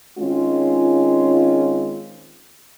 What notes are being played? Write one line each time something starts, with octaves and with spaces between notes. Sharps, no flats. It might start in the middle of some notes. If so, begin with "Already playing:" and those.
D#3 G#3 C4 C#4 F4